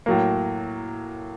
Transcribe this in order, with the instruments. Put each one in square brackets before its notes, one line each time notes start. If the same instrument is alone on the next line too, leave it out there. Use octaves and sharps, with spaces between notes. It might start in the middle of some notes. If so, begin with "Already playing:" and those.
[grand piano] A2 F#3 A#3